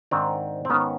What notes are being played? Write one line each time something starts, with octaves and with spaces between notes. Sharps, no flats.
G#2 D#3 C4 D4
C4
G#2 D#3 B3 C#4